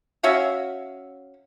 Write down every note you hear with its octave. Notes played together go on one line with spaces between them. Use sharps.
C#4 F#4 E5 F5